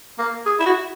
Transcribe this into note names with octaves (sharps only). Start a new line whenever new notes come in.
A#3
G#4
E4
F#4